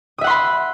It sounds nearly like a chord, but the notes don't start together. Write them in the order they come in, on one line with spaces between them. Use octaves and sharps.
D#6 E5 F#5 C6 B5